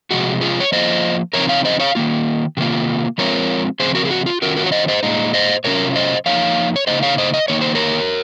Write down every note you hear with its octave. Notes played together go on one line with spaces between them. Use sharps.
C3 F3 G#3 F#4
F4 G#4
C#5
F3 A#3 F4 C5 D#5
C#3 F3 C4 D#4 A#4 C#5
C#5 F5
C5 D#5
C#5 F5
D#3 A#3 F4
C3 D#3 A#3 F4
F3 G#3 C4 F4 A#4 C#5
C#3 F3 C4 G#4 C5
F#4 A#4
G#4
F#4
F4
D#3 F#3 C#4 F4 F#4 A#4
F#4 A#4
C#5
C5 D#5
C5 D#5
A#2 G#3 D#4
C5 D#5
C3 F#3 C#4 F4 A#4 C#5
C5 D#5
F3 A#3 D#4 C#5 F5
C#5
C#3 F3 A#3 D#4 C5 D#5
C#5 F5
C5 D#5
D#5
D#3 A#3 D#4 C#5
C5
A#4 C#5